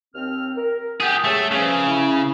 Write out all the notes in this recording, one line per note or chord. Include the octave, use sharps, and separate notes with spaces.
D#2 C4 F6
A#4
G4 G#4 F#5 G5
A3 C#4 G4 G#4
A#2 C#3 E3 F3
E4